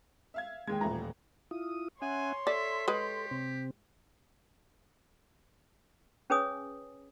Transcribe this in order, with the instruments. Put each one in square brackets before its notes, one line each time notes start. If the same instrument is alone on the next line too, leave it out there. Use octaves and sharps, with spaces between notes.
[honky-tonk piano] E5 F5 G#6
[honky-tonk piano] D#2 G#6 [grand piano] G#3 G5
[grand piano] D#1 A#5 [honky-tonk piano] A2 E3 F3
[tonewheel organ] E4 F4 D#6
[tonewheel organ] C#4 E5 F#5 [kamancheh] C#5 C6 [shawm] G#5
[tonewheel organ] A4 [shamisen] D5 [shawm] E5
[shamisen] G#3 B4 [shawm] G4
[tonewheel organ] C3 C4
[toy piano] C#4 G#4 B4 C#5 G#5 D#6